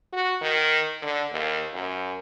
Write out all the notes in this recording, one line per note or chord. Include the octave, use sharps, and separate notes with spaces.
F#4
D#3
D3
D#2
F#2